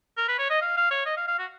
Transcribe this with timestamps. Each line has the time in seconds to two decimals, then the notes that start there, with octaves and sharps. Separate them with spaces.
0.17 A#4
0.28 B4
0.39 C#5
0.50 D#5
0.62 F5
0.77 F5
0.91 C#5
1.06 D#5
1.17 F5
1.28 F5
1.39 F#4